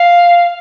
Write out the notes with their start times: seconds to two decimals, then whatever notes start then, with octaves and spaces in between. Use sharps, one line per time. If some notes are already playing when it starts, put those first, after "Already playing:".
Already playing: F5